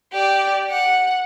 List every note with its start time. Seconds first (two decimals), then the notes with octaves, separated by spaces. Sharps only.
0.12 G4 D5
0.70 F#5